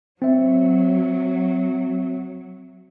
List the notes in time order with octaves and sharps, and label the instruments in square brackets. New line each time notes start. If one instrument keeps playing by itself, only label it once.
[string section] F#3 [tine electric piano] C4 E5